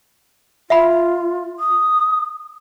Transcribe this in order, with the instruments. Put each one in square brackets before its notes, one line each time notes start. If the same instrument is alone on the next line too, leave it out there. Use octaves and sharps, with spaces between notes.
[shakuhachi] F4 [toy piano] E5 F#5 B5
[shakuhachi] D#6